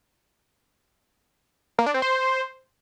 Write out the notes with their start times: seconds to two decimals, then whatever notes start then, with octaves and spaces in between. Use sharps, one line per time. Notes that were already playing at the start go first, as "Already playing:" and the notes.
1.79 A#3
1.86 D4
1.94 C4
2.02 C5